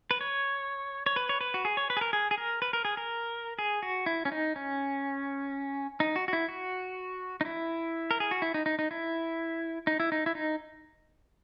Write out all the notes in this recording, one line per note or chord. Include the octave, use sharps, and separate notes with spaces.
B4
C#5
C#5
B4
C#5
B4
F#4
G#4
C#5
B4
G#4
A#4
G#4
G#4
A#4
B4
A#4
G#4
A#4
G#4
F#4
E4
C#4
D#4
C#4
D#4
F#4
F#4
E4
F#4
D#4
E4
A#4
G#4
F#4
E4
D#4
D#4
D#4
E4
D#4
E4
D#4
E4
D#4